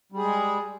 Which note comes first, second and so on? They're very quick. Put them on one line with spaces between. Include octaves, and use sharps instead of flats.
G3 G#4 G#3